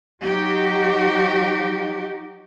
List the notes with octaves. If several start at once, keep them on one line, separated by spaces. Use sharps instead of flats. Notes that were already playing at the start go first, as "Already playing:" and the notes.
F#3 D#4 F#4 G4